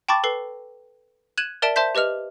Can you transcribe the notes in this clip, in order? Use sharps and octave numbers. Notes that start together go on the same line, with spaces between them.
G5 A5 B5 C#6 D6 A6
A4 B4 C7
F#6 G#6 D#7 E7 F#7
A#4 D5 E5 A5 D7 E7
C5 E5 A5 C6 G6 B6
G4 B4 D#5 F6 F7